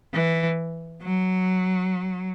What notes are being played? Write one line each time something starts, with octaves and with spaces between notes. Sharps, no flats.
E3
F#3